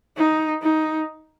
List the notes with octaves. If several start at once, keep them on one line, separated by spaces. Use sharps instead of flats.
D#4
D#4